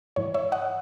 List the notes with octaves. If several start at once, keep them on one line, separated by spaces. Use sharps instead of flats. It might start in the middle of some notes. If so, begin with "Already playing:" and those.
G#2 E3 C#5
C#5 E5
D#5 F#5